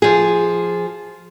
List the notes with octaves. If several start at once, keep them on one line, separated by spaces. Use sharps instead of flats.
F3 G#4